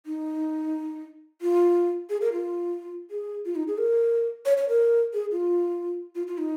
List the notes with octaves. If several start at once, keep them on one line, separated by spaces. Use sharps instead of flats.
D#4
F4
G#4
A#4
F4
G#4
F4
D#4
G#4
A#4
C#5
C#5
A#4
G#4
F4
F4
F4
D#4